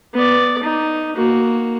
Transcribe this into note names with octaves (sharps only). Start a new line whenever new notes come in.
B3 D5
D#4
A#3 F#4